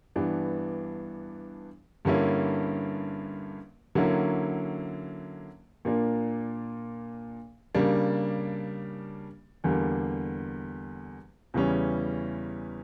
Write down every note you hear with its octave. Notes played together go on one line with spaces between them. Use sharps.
G2 E3 B3 D4
G2 D3 A#3 C#4 E4
D3 F#3 A#3 C#4 E4
A#2 A#3 D4
C#3 G3 A#3 D4
E2 D3 G3 A#3
E2 C#3 E3 G3 C#4